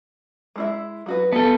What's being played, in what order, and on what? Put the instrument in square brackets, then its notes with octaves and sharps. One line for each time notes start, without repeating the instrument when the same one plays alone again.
[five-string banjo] G#3 E4 E5
F#3 F#4 B4
[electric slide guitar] B3 A4 [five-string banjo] A5